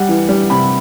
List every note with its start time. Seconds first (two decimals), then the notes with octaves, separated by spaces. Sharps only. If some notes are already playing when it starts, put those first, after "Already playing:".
Already playing: G3 F#5
0.09 E3
0.29 G3
0.50 C3 B5